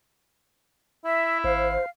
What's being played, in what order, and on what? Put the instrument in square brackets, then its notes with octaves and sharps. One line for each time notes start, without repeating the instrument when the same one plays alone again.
[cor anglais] E4 [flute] E5
[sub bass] G#1 [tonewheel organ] C5 [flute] F5